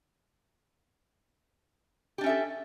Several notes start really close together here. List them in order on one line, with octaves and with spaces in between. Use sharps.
G4 D4 C#4 E5 A4